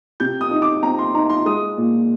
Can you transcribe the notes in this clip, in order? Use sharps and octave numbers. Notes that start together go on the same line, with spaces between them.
C3 G6
D#6
D#4
D6
C4 A#5
C6
D#4 A#5
C6
G#3 D#6
A#2